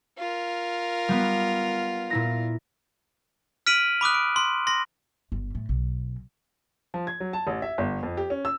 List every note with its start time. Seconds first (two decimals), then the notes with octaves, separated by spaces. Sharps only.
0.18 F4 A#4
1.09 G3 B3
2.10 A#2 E4 A#6
3.66 F6 B6 D7 D#7 F#7
4.01 B5 D6 D#6 F#6
4.14 D7
4.36 C6
4.67 C6 A#6
5.32 G1
5.55 A2
5.69 B1
6.94 F3
7.07 G#6
7.20 F#3
7.33 A5
7.47 A1
7.62 E5
7.78 G1
8.03 F2
8.17 G4
8.30 C#4
8.45 E6